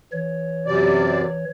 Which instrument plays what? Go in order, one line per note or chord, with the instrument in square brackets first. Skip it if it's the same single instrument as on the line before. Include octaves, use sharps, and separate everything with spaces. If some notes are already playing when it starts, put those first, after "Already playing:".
[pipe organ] E3 C#5
[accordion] F#2 C3 D5